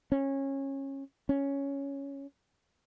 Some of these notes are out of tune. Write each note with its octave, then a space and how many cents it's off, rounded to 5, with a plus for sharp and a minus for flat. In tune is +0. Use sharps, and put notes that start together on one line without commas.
C#4 -20
C#4 +5